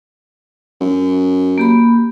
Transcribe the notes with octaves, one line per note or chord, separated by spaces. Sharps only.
F#2
A#3 G4 B5